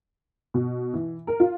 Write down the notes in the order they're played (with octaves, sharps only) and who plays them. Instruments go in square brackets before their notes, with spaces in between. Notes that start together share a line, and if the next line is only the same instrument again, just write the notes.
[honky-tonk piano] B2
E3
A#4
F4